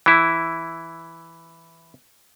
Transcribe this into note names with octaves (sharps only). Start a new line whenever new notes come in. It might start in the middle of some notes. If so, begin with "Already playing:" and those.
E3 E4